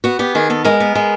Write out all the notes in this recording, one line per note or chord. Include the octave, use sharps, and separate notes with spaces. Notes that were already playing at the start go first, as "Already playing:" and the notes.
B3 F#4
B3 G4
D#3 G#4
B3 A4
G#3 A#4
B3
G#3